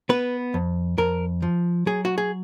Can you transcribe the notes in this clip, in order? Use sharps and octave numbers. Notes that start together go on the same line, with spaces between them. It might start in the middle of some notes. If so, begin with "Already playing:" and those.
B3 B4
F2
F2 A#4
F3
F#3 G#4
F#4
G#4